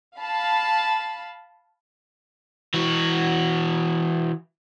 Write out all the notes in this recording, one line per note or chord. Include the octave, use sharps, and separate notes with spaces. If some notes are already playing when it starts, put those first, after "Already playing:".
F5 A5 B5
E3 F#4